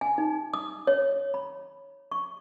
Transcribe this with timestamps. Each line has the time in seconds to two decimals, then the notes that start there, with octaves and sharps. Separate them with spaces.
0.01 G#5
0.18 D#4
0.54 D#6
0.87 C#5
1.34 B5
2.12 C#6